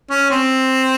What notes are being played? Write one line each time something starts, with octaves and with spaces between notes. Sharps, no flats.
C#4
C4